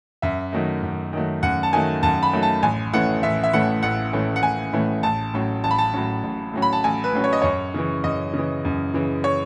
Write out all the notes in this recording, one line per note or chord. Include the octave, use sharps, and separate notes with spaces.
F#2 E5
D#3 F#3 A3
F#2
D#3 F#3 A3
F#2 F#5
A5
D#3 F#3 A3 G#5
F#2 A5
B5
D#3 F#3 A3
A5
A1 G#5
A2 E3 A3 C#4 F#5
A1 E5
E5
A2 E3 A3 C#4 F#5
A1 F#5
A2 E3 A3 C#4
F#5
A1 G#5
A2 E3 A3 C#4
A1 A5
A2 F#3 C#4
A1 A5
B5
A5
A2 F#3 C#4
A1
A2 F#3 C#4
B5
A5
A1 G#5
B4
A2 F#3 C#4
C#5
D#5
F#2 C#5
C#3 E3
F#2 D#5
C#3
E3
F#2
C#3 E3
C#5